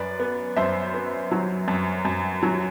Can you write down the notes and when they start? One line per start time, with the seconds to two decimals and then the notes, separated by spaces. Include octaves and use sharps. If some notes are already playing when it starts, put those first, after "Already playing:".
Already playing: F#2 B4 D5
0.20 B3
0.56 F#2 C5 E5
0.94 B3
1.31 F#3
1.68 F#2
2.05 F#2
2.43 F#3